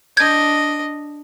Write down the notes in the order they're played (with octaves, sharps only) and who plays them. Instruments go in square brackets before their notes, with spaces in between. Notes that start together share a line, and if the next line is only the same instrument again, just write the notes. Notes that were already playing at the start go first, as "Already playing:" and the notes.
[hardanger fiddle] D4 D#5 [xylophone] G6 G#6